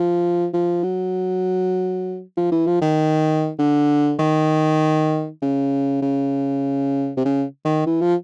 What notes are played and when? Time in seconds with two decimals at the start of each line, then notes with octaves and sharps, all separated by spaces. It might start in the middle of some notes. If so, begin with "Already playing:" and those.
Already playing: F3
0.54 F3
0.83 F#3
2.37 F3
2.52 E3
2.67 F3
2.82 D#3
3.59 D3
4.19 D#3
5.42 C#3
6.02 C#3
7.17 C3
7.25 C#3
7.65 D#3
7.86 E3
8.01 F3